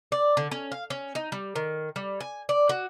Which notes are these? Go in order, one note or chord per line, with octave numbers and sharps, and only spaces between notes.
D5
D3
C#4
F5
C#4
D#4
G3
D#3
G3
G#5
D5
F#4